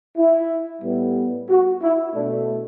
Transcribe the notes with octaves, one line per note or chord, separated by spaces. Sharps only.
E4
A2 G3 B3
F#4
E4
B2 A3 D4